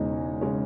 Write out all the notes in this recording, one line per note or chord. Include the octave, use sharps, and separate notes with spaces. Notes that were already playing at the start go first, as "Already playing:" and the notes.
Already playing: E1 E2 C#3 G#3 D#4
C#3 G#3 C#4